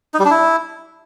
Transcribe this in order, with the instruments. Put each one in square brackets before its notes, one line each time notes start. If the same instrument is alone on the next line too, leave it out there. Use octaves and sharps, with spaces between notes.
[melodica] D#4
G3
D4
E4